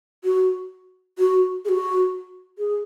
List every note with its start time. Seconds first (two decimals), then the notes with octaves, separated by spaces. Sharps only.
0.24 F#4
1.18 F#4
1.65 G#4
1.69 F#4
2.58 G#4